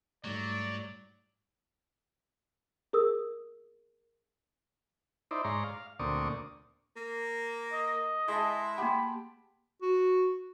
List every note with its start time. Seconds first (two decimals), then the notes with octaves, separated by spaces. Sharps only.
0.24 G#2 F#3 G3 A3 D5
2.93 G#4 A#4 D#6 E6
5.31 D#4 E4 C5 D5
5.44 G#2 C#5 D5 A#5 C6
5.64 F5
5.99 D2 A#2 C4 D5 C#6 D#6
6.96 A#3
7.73 D#5
8.28 G#3 E4 A5
8.78 A#3 G4 F#5 B5
9.82 F#4